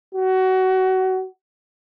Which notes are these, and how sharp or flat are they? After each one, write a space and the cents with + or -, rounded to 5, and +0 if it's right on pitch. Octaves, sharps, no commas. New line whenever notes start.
F#4 +25